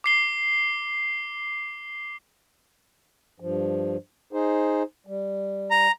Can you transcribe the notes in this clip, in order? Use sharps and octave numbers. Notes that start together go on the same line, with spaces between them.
D6 C7 G7
G2 F3
D#4 G#4 C5
G3
A#5